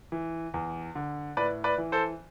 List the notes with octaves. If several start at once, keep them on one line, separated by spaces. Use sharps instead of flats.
E3
E2
D3
A2 B4 D5
B4 D5
E3
A4 C5